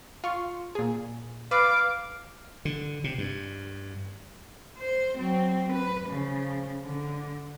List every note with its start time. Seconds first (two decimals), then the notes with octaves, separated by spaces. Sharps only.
0.24 F4 C6 C#6
0.75 A#2 G#4
1.51 B4 F5 D6
2.65 D3
3.04 C3
3.18 G2
4.78 C5
5.17 F#3 C4
5.72 B4
6.09 C#3 F3
6.84 D3